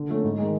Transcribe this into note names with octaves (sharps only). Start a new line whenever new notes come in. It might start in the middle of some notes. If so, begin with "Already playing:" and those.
Already playing: D3
F3 A3 C#4
G#2
D#3 G#3